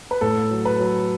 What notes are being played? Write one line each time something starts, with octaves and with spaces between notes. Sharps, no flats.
B4
A2 A4
F#3
B4
F#3